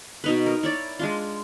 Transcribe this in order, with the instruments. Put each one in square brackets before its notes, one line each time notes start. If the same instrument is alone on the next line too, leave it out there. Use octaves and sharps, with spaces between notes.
[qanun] B2 D#4 B4
A#4
E4 C#5 D5
G#3 D4 F4